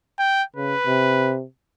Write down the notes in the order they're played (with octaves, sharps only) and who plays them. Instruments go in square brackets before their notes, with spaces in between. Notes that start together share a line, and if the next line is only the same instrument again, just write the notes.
[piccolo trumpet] G5
[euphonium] C#3 [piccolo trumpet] B4
[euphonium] C3